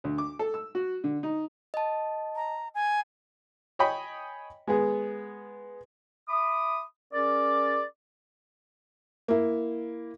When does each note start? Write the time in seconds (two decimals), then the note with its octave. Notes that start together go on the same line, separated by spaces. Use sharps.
0.04 D2
0.18 D6
0.39 A4
0.54 E6
0.75 F#4
1.04 D3
1.23 D#4
1.74 D#5 A5
2.36 A#5
2.75 G#5
3.79 C#5 D#5 G5 G#5 B5
4.67 G#3 B3 G#4
6.28 E5 B5 D6 D#6
7.13 C#4 G#4 A#4 D5
9.28 A#3 E4